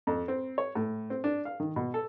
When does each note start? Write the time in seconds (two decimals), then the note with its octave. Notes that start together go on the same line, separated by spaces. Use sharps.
0.07 F2
0.28 C4
0.58 C#5
0.75 A2
1.10 C4
1.24 D4
1.45 F5
1.60 D#3
1.76 B2
1.94 A4